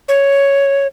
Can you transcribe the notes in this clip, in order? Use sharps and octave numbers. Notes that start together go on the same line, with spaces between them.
C#5